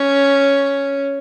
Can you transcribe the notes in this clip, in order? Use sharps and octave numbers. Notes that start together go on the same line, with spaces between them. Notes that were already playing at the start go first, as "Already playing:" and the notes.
Already playing: C#4